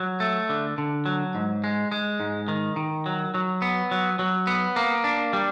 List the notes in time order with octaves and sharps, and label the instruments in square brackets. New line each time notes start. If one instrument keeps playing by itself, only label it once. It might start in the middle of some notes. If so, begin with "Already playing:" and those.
Already playing: [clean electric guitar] F#3
A3
D3
D3
F#3
G#2
G#3
G#3
G#2
D#3
D#3
F#3
F#3
B3
F#3
F#3
B3
A#3
D4
G3